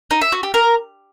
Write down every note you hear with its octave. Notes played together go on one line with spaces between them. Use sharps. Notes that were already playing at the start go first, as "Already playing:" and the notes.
D#4
E5
F#4
G4
A#4